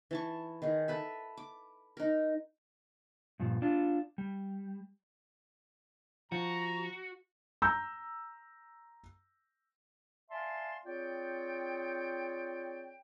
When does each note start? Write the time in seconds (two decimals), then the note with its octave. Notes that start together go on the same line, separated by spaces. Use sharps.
0.11 E3 A5 C#6
0.62 D#3 D#4 G#4
0.88 A4 B4 E5
1.37 D6
1.97 D#4 A#4
3.40 G2 A#2 F3
3.62 D4 F4
4.18 G3
6.32 F3 F#4 A#5
7.62 A#5 E6 G6
10.31 D5 E5 F5 G#5 A5 C6
10.86 C4 F4 G#4 C#5 D5 G5